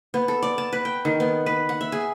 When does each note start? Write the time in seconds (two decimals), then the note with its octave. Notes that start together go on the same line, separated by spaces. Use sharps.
0.14 B3
0.28 A4
0.43 D5
0.58 A5
0.73 B4
0.85 G5
1.05 D#3
1.20 B3
1.46 B4
1.69 F#5
1.81 E5
1.92 G#4